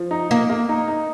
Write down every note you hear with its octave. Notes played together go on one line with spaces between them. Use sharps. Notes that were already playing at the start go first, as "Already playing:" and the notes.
Already playing: F3
D#4
A#3 D#4
A#3
D#4
D#4